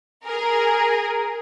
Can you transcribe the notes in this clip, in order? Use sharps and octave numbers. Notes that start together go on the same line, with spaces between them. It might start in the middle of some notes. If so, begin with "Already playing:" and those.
G#4 A#4